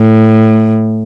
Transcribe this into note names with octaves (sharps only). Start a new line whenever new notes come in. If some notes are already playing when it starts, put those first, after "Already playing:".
Already playing: A2